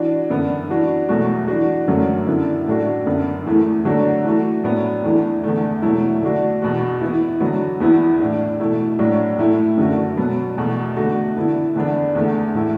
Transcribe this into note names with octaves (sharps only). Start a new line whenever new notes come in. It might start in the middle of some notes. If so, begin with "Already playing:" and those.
Already playing: E3 D4 F#4
F#2 D3 B3
E3 D4 F#4
E2 B2 F#3 A3 F#4
E3 D4 F#4
F#2 D3 F#3 A3
F#2 D3 B3 E4
A2 A3 D4 F#4
F#2 D3 B3
E2 E3 A3
D3 F#3 A3 D4 F#4
E3 A3 F#4
A2 F#3 B3 D4
E2 E3 A3 D4
E2 D3 A3
B2 F#3 A3 E4
D3 A3 D4 F#4
E2 B2 B3 F#4
E3 B3 E4
D3 F#3 B3 F#4
E2 E3 B3 E4
A2 E3 D4
B2 A3 E4
A2 F#3 D4 F#4
A2 A3 E4
F#2 D3 A3 F#4
B2 F#3 B3
E2 B2 A3
D3 A3 F#4
D3 B3 E4
E2 D3 B3 D4
E2 D3 A3
A2 A3 E4